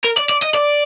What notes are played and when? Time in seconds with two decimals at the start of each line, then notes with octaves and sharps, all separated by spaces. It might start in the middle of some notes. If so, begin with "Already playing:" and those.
0.05 A#4
0.17 D5
0.29 D5
0.42 D#5
0.54 D5